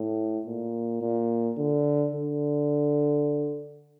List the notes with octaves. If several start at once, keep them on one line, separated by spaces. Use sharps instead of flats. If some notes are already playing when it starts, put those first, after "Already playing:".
Already playing: A2
A#2
A#2
D3
D3